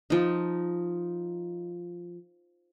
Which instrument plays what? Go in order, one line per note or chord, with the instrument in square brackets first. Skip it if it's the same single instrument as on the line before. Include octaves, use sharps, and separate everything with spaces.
[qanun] F3 D#4